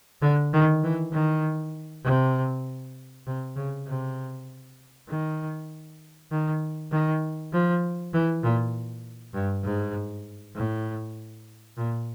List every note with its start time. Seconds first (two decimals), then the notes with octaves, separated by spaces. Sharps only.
0.22 D3
0.53 D#3
0.84 E3
1.13 D#3
2.05 C3
3.27 C3
3.56 C#3
3.87 C3
5.08 D#3
6.31 D#3
6.92 D#3
7.52 F3
8.14 E3
8.43 A#2
9.34 G2
9.65 G#2
10.56 A2
11.78 A#2